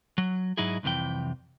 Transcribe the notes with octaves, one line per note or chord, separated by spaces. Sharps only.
F#3
G#2 F#3 D#4 E4 G#4
C2 F2 C3 E3 G5